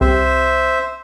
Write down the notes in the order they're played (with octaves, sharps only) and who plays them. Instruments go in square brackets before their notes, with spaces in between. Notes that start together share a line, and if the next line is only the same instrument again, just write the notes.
[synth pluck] C2 [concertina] C5 E5